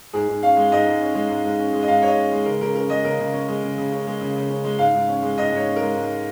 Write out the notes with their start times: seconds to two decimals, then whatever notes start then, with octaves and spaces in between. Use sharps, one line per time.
0.13 G#2 G#4
0.28 G#2
0.42 C#4 F5
0.57 G#3
0.72 G#2 D#5
0.86 G#2
1.01 C#4
1.15 G#3
1.29 G#2
1.45 G#2
1.59 C#4
1.73 G#3
1.82 D#5
1.88 G#2 F5
2.02 G#2 C#5
2.08 D#5
2.17 C#4
2.32 G#3
2.46 C#3 A#4
2.61 C#3 A#4
2.75 C#4 A#4
2.89 G#3 D#5
3.04 C#3 A#4
3.20 C#3
3.33 C#4
3.48 G#3
3.63 C#3
3.78 C#3
3.92 C#4
4.07 G#3
4.21 C#3
4.36 C#3
4.49 C#4
4.65 G#3
4.79 G#2 F5
4.94 G#2
5.08 C#4
5.23 G#3
5.37 G#2 D#5
5.52 G#2 C#5
5.67 C#4
5.76 G#3 A#4
5.96 G#2